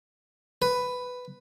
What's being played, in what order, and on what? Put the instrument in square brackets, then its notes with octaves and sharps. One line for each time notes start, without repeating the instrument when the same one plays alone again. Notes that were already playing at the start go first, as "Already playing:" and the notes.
[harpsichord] B4